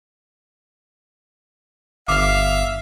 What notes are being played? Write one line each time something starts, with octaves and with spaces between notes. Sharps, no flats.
G1 E5 F5 D6 F6